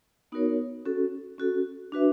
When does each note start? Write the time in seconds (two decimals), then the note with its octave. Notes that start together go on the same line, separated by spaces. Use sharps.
0.32 B3 D#4 F#4 A#4 C#5
0.86 C#4 F#4 A4
1.38 C#4 F#4 A4
1.92 D4 F#4 B4 E5